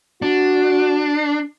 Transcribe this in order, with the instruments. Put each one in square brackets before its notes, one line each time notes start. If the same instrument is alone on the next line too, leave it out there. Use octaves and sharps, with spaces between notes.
[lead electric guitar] D4 [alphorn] F#4